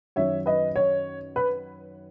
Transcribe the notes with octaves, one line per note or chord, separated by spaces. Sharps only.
F#2 D#3 F#3 C#5 E5
B4 D#5
C#5
B4